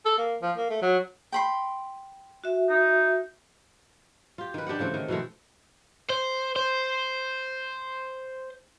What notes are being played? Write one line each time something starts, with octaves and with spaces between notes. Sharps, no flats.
A4
A#3
F3
A#3
A3
F#3
G5 B5 C6
F#4 E5
D#4
F4 G4
D#3 B4
D4 G4 D5 F#5
C#3 E3 A3 C4
D#3
B2 E3 G#3 A3
C5
C5